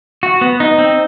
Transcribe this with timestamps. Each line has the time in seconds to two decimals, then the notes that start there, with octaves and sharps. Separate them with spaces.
0.23 F#4
0.41 B3
0.60 D#4
0.78 C4